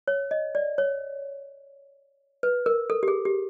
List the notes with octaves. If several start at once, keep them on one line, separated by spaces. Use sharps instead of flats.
C#5
D#5
D5
C#5
B4
A#4
A4
G4
G#4
G4